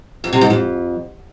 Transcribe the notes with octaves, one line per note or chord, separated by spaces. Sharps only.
F2
C3
G#2
F2